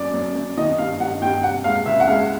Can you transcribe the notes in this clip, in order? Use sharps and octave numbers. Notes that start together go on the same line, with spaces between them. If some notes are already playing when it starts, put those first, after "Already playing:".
Already playing: F#2 D5
F#2
F#2
D#3 D#5
G2 F5
G2 F#5
G2 G5
C3 F#5
G#3 F5
C#2 E5
F#5
G#3 F5